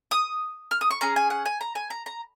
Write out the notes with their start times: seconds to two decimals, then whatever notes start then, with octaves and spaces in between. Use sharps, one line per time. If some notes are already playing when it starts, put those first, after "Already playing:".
0.11 D#6
0.71 F6
0.81 D#6
0.91 C#6
1.01 C#4 G#4 A#5
1.16 G#5
1.30 F#5
1.46 G#5
1.61 A#5
1.75 G#5
1.90 A#5
2.06 A#5